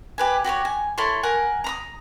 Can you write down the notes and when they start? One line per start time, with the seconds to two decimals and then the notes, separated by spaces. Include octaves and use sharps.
0.18 G4 B4 G#5
0.44 F#4 G4 C5 C#5
0.65 G#5
0.98 E4 A4 C#5 C6
1.23 A#4 F#5 G#5
1.64 A#5 B5 D#6